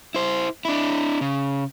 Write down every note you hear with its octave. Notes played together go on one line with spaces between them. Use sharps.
E4 C5
D4 E4
C#3